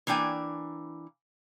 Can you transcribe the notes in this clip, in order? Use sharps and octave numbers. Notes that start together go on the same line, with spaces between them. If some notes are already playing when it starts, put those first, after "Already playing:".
E3 A#3 D4 G5 G#5